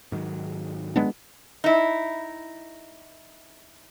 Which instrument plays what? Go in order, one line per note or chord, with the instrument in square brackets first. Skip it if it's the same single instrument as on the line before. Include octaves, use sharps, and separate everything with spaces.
[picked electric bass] G#2 D#3 F#3
[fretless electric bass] G#3 B3 D4
[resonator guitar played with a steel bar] D#4 E4